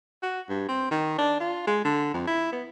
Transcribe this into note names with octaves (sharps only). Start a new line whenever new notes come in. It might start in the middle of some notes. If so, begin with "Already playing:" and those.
F#4
G2
C4
D#3
D4
F4
G#3
D3
F2
E4
B3